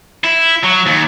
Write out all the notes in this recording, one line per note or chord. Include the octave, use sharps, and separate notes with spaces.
E4
F#3
D#2